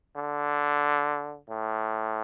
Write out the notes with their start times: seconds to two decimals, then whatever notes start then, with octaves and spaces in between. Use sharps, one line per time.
0.16 D3
1.49 A2